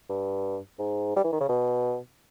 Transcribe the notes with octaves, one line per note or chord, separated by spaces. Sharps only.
G2
G#2
G3
E3
D#3
C#3
B2